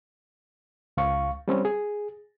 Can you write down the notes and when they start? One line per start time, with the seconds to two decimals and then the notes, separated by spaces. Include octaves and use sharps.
0.97 C#2 F5 C#6
1.48 G3 C4 C#4
1.65 G#4